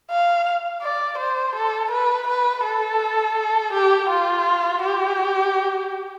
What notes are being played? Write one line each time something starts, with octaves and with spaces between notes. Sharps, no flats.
F5
D5
C5
A4
B4
B4
A4
G4
F4
G4